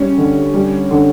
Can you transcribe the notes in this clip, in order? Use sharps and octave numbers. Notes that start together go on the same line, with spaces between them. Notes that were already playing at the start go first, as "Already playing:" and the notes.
Already playing: C#3 G3 C#4
D3
G3
D3